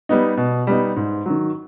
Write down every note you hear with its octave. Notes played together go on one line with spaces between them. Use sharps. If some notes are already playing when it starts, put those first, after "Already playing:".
G3 B3 D#4
B2
G3 B3 D#4
G#2
D#3 F#3